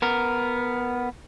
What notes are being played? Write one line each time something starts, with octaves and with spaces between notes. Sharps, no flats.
B3 A#4